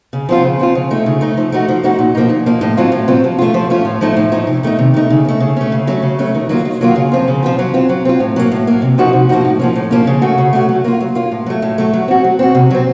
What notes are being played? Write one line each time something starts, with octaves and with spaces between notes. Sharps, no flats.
C#3
F3 C4 F4
C#3
F3 C4 F4
C#3
A3 D#4
C#3
A3 D#4
F3
A3 D#4 F#4
F3
A3 D#4 F#4
A#2
F3 A#3 D#4
A#2
F3 A#3 D#4
A2
F#3 C4 F4
A2
F#3 C4 F4
F3
A3 C#4 F4
F3
A3 C#4 F4
A2
F3 A3 D#4
A2
F3 A3 D#4
C3
D#3 A3 D#4
C3
D#3 A3 D#4
C#3
A3 C#4
C#3
A3 C#4
C#3
F#3 A3 C#4
C#3
F#3 A3 C#4
D#3
F#3 A#3 F4
D#3
F#3 A#3 F4
C#3
F3 C4 F4
C#3
F3 C4 F4
F#3
C4 F4
F#3
C4 F4
A2
F#3 A#3
A2
F#3 A#3
C3
F3 A#3 D#4 F#4
C3
F3 A#3 D#4 F#4
A2
F3 A#3 C#4
A2
F3 A#3 C#4
C#3
A3 C#4 F#4
C#3
A3 C#4 F#4
F#3
A#3 F4
F#3
A#3 F4
A2
F#3 A3
A2
F#3 A3
F#3
C4 F#4
F#3
C4 F#4
C3
F#3 C4